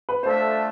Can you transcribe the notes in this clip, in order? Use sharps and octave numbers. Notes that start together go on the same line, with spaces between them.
B4
A3 D4 F4 A4 C5 E5